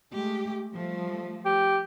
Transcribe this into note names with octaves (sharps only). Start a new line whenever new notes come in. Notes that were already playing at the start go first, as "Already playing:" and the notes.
G#3 A3 G4
F3 G3 A3
G4